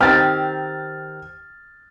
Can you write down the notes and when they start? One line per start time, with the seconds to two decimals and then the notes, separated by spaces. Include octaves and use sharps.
0.01 D#3 C4 G4 F6 A6